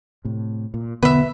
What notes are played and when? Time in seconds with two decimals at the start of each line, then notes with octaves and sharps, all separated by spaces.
0.25 A2 C3
0.74 A#2
1.03 B1 E2 B2 D3 B3 B4 E5